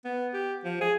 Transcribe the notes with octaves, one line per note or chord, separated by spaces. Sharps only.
B3
G4
F3
G#4